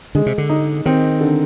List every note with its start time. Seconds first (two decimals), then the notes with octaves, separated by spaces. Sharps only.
0.15 D3 G#3
0.26 C3
0.38 D3
0.49 D#4
0.86 D#3 C4
1.21 D3